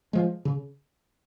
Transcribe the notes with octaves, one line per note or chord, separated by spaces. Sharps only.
F3 G#3
C#3